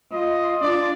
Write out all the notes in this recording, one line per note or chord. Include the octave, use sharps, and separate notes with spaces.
F4 D#5
D4 F4 D5